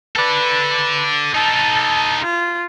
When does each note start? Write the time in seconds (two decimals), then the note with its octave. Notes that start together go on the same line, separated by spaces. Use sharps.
0.16 A4 B4 D5
1.34 D#4 A4 A5
2.21 F4